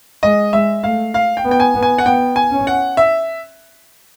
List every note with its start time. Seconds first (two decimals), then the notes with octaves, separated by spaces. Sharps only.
0.23 G#3 D#5
0.53 G#3 E5
0.84 A3 F5
1.14 F5
1.37 G5
1.44 B3
1.51 G5
1.60 G#5
1.75 B3
1.83 G#5
1.98 F#5
2.06 B3 G5
2.36 G#5
2.52 C#4
2.67 F#5
2.97 E5